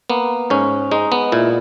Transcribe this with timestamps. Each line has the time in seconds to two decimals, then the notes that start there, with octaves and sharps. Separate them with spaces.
0.10 A#3 B3
0.50 G#2 C#4
0.91 G#3 D#4
1.12 B3
1.32 A#2 E4